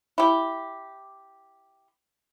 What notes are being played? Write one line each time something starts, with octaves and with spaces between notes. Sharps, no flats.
E4 G4